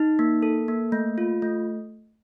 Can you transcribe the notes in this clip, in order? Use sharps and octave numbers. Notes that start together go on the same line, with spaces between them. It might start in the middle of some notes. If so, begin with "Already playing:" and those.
Already playing: D#4
A#3
A4
A#3
A3
F4
A3